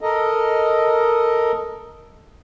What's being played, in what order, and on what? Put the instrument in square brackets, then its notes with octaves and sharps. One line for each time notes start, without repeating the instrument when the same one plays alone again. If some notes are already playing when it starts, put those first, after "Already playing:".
[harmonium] A4 A#4 D#5